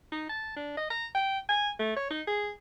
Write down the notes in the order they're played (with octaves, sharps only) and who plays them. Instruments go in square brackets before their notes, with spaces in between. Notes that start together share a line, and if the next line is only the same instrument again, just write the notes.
[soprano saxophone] D#4
A5
D4
D#5
A#5
G5
G#5
A3
C#5
D#4
G#4